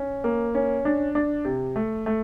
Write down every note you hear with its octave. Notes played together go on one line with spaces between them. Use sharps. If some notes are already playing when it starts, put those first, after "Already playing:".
Already playing: C#4
A#3
C#4
D4
D4
C3
A3
A3